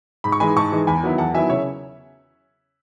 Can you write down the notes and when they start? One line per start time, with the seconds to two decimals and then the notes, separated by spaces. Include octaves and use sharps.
0.24 G#2 B5
0.32 C#6
0.40 E3 G#3 D#4 G#5 B5
0.56 G#2 A5 C#6
0.72 E3 G#3 D#4
0.87 E2 G#5 B5
1.03 D#3 F#3 B3 E4
1.18 E2 F#5 A5
1.34 D#3 F#3 B3 E4 E5 G#5
1.49 C#3 C#5 E5